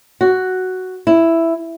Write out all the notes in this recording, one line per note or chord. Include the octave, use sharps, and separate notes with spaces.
F#4
E4